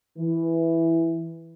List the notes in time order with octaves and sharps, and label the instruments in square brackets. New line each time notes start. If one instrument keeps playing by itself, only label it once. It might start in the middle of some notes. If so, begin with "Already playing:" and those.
[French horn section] E3